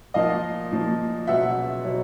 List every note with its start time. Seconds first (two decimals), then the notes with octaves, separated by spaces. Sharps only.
0.14 A#2 F3 A#3 D#5 F5
0.71 A#2 F3 A#3
1.27 C#2 B2 F#3 E5 F#5
1.84 B2 F#3